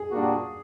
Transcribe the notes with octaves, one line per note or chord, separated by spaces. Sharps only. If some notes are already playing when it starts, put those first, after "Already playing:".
Already playing: G#4
A#2 G3 A#3 D4 F#4